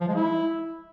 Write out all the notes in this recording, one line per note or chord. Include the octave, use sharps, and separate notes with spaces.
F3
G#3
E4